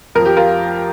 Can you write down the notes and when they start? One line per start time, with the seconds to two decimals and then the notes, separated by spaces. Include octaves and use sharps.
0.15 F2 F3 A#4
0.26 G4
0.37 F4 A#4